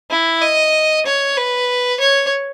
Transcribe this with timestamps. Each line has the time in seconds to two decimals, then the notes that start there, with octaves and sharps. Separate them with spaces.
0.11 E4
0.42 D#5
1.06 C#5
1.38 B4
2.01 C#5